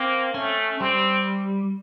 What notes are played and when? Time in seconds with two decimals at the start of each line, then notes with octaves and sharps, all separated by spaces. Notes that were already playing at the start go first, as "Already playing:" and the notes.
Already playing: A#3 C4
0.34 A3 C#4
0.80 G3 C4